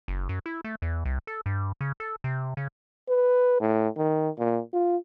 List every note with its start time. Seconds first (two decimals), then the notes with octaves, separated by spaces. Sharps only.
0.08 F#1
0.29 F#2
0.46 E4
0.64 A3
0.82 E2
1.05 C2
1.27 A4
1.46 G2
1.81 C#3
2.00 A4
2.24 C3
2.57 C#3
3.08 B4
3.60 A2
3.97 D#3
4.38 A#2
4.73 F4